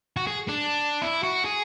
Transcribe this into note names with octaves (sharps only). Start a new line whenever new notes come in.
F#4
G#4
D4
E4
F#4
G#4